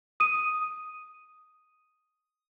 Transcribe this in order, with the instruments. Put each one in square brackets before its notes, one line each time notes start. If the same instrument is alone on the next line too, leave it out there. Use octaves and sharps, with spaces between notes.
[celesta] D#6 D#7